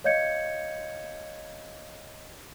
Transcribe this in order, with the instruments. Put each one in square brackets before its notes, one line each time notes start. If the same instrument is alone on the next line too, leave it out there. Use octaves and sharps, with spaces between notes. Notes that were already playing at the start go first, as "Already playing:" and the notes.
[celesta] C#5 D#5 F5 G6 G#6 C#7